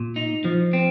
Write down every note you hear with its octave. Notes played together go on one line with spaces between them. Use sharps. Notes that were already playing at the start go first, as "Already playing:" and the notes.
Already playing: A#2
D#4
F3
C4